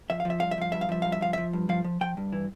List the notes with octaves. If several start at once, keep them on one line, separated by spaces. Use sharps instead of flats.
F3 E5
F5
F3
E5
G2 F5
E5
F3 F5
G2 E5
F5
F3 E5
G2 F5
E5
F3 F5
F3 E5
G2
F3 F5
F3
F3 G5
G2
E3